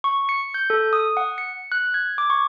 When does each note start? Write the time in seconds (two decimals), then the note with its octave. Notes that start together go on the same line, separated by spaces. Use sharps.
0.04 C#6
0.29 C#7
0.54 G6
0.70 A4
0.93 D#6
1.17 F#5
1.38 C#7
1.72 F#6
1.94 G#6
2.18 D6
2.30 C#6